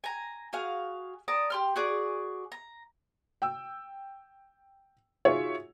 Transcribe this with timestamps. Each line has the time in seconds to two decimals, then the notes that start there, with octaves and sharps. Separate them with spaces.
0.04 G#5 A#5
0.53 F#4 G#4 F5
1.28 D5 A5 A#5 D#6
1.50 G4 C6 F6
1.76 F#4 G#4 D5
2.52 A#5
3.42 G5 E6
5.25 D#4 F4 F#4 G#4 C#5 E5